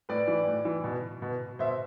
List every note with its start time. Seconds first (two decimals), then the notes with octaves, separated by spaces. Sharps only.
0.09 A2 B4 D5
0.27 E3
0.47 A2
0.65 E3
0.84 B2
1.22 B2
1.59 B2 C5 E5